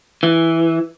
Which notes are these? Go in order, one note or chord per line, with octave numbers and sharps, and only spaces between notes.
E3